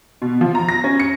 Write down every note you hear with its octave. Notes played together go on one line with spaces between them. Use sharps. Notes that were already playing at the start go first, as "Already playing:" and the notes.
B2
F3
A#5
A#6
C#4
C#7